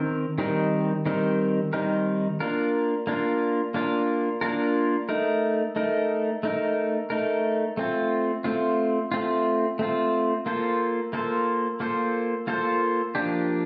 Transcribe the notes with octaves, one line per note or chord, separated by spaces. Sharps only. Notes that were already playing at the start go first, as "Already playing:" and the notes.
Already playing: D#3 C4 A#4
D#3 G3 C4 D#4 A#4
D#3 G3 C4 D#4 A#4
D#3 G3 C4 D#4 A#4
A#3 D4 F4 A#4
A#3 D4 F4 A#4
A#3 D4 F4 A#4
A#3 D4 F4 A#4
A3 D#4 A#4
A3 D#4 A#4
A3 D#4 A#4
A3 D#4 A#4
A3 C4 F4
A3 C4 F4
A3 C4 F4
A3 C4 F4
A#3 F4 A4 C5
A#3 F4 A4 C5
A#3 F4 A4 C5
A#3 F4 A4 C5
F3 A#3 D4 G4